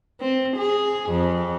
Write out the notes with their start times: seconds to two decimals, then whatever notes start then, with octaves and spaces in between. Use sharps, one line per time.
0.20 C4
0.57 G#4
1.10 F2